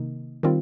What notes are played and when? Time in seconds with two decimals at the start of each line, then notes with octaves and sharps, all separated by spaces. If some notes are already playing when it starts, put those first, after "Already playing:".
Already playing: C3 D#3 A#3 D#4
0.43 D#3 G3 C4 F4